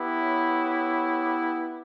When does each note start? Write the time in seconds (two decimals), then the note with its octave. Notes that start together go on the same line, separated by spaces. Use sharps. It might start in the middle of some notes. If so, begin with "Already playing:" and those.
Already playing: B3 E4 G4
0.17 C#5